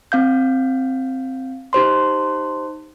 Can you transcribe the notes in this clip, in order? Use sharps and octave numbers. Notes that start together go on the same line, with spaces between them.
C4 F5 G6
D#4 G4 C5 C6